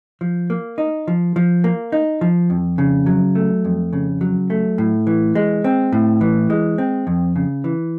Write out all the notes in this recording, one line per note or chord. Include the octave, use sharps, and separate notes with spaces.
F3
A#3
D#4
F3
F3
A#3
D#4
F3
F2
C#3
F#3
A3
F2
C#3
F#3
A3
A2
E3
G#3
C4
A2
E3
G#3
C4
F2
C#3
E3